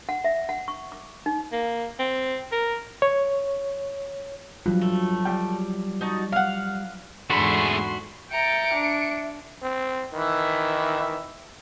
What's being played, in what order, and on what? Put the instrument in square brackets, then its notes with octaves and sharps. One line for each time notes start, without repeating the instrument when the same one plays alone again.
[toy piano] F#5
E5
F#5
C#6
D6
D#4
[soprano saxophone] A#3
C4
A#4
[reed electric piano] C#5
[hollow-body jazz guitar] G2 [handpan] F3 F#3 F4
[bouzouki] A3
[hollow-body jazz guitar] G3 G5
[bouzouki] D#4 F#4 A5
F5 F#5
[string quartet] E2 G#2 D3 [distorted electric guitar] A3 G#4 [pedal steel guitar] F#4 B5 [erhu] C6
[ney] E5 [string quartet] G5 A#5 A6 [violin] C#7 D7
[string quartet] D4
[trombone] C4
[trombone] D#3 [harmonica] E3 B4 E5